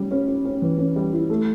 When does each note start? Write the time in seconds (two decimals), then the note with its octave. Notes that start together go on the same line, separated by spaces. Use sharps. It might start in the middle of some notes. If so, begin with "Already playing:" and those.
Already playing: G3 C#4
0.11 C#4
0.27 C#4
0.45 C#4
0.62 E3
0.78 C#4
0.96 G3
1.13 E4
1.30 A3